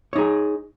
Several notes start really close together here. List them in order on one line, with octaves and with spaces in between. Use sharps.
C#5 D#4 G#4